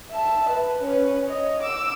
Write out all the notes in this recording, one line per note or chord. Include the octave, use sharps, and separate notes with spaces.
E5 A5
B4
C#4 B4
C#5 D#5
D6 E6